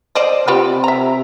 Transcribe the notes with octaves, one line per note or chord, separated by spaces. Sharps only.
C5 D5 D#5
C3 F4 G4 B4
E5 A#5